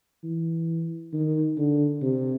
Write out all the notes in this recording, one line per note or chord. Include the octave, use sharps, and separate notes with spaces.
E3
D#3
D3
C3